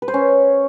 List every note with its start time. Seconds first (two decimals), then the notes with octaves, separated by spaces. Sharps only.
0.02 B4
0.08 C5
0.14 C#4